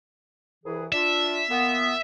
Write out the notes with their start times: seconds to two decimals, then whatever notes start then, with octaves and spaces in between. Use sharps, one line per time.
0.64 C2 E3 G#4
0.92 D4 F4 E5
1.49 A#2 B3